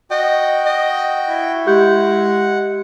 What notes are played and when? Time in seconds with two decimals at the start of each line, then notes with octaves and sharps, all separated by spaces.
0.11 F#4 D#5 G5
0.66 D#5
1.29 E4
1.67 G#3 G4 F#5 G6